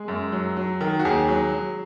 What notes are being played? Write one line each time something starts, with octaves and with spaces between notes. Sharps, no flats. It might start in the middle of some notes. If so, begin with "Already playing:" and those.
Already playing: G#3 G#4
F#2
F#3
F#3
D#3
F#4
D#2 G#4
F#3
F#3